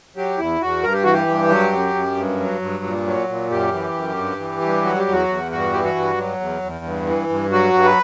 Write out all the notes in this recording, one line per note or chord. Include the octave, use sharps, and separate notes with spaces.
F#3 G4
E2 E4
E2 F#4
G2 A#4
G4
E3 F#4
G4
G2
F#3
F#2
F#2
G2
F#3
G2
A#2
F#3
A#2
F#2 G4
E3
F#2
G2
E3
G2
F#3 F#4
G4
E2
F#4
E2
G2 F#4
E3 G4
F#4
G2
F#3
E2
E2
G2
E3
G2
F#3 F#4
G2
B4